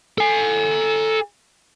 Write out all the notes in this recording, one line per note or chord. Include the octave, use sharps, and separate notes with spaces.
A4 G#5